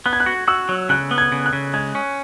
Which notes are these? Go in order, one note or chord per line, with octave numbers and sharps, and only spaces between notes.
B3 F#6
G#6
F#6
F#4
F#4 E6
F#3
C#3 F#6
B3
G#6
C#3
F#6
C#3
G#3 G#6
C#4